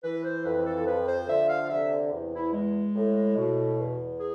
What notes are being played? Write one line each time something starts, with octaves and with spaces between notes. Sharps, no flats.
E3 B4
C5
F2 B4
A4
F3 B4
C5
D3 E5
F5
C3 E5
E2
E4
G#3
A2
B2
E2
G#4